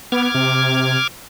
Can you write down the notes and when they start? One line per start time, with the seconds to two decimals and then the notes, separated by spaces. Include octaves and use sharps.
0.12 B3 D6 F6 G#6
0.35 C3